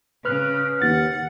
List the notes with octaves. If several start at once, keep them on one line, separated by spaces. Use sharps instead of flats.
C#3 B4 F6 F#6
D#2 F#5 A6